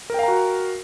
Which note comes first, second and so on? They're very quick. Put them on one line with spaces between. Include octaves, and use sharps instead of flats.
A#4 G5 F5 A#5 F#4